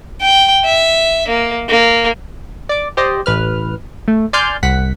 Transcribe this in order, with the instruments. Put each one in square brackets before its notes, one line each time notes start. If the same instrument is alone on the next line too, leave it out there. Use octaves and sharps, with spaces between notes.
[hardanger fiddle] G5
E5
A#3
A#3
[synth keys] D5 D6
G4 C5 D5 D#5
A1 B4 F6
A3
D5 G#5 C6 F6 G6
C2 F#5 B6